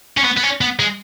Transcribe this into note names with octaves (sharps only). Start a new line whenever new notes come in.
C#4
B3
B3
C#4
B3
G#3